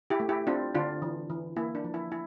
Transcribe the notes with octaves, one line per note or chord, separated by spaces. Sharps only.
E4 G4
A3
E4 G4
C4 D4 F4
D3 D4 F4
E3
E3
A#3 E4
D4
F3
E4
E4